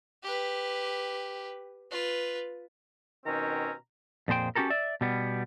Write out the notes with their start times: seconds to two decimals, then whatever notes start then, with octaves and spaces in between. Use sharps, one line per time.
0.23 G4 B4
1.91 F4 B4
3.25 B2 D#3 C4 C#4 G4 A#5
4.28 F2 A#2 G#4 C5 G5
4.55 C#4 F#4 G4 A4 A#4
4.70 D5 E5
5.01 B2 G3 B3